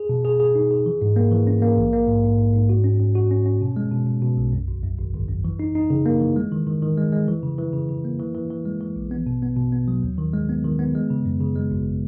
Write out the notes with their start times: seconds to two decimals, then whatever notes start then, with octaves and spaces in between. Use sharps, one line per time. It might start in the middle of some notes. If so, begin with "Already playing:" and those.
Already playing: G#4
0.09 B2
0.25 G#4
0.40 G#4
0.55 D#4
0.71 G#4
0.86 E3
1.02 G#2
1.16 A#3
1.32 E3
1.47 C#4
1.62 A#3
1.77 A#1
1.93 A#3
2.08 G#2
2.23 G#2
2.39 G#2
2.54 G#2
2.69 F#4
2.84 C#4
3.00 C#4
3.15 F#4
3.31 C#4
3.46 C#4
3.61 B2
3.76 G#3
3.91 B2
4.07 B2
4.22 B2
4.38 B1
4.53 F#2
4.68 G#1
4.83 F#2
4.99 G#1
5.14 G#1
5.29 F#2
5.44 E3
5.59 D#4
5.75 D#4
5.90 C#3
6.06 A#3
6.21 E3
6.36 G#3
6.52 D#3
6.66 D#3
6.82 D#3
6.97 G#3
7.12 G#3
7.28 E3
7.43 C#3
7.59 E3
7.74 C#3
7.89 C#3
8.04 A#3
8.20 E3
8.35 E3
8.50 E3
8.65 G#3
8.81 E3
8.96 A#1
9.11 B3
9.27 B2
9.42 B3
9.57 B2
9.72 B3
9.88 F#3
10.03 D#2
10.18 D#3
10.33 G#3
10.49 B3
10.64 D#3
10.79 B3
10.95 G#3
11.10 C#3
11.25 F#2
11.40 C#3
11.56 G#3
11.71 G#1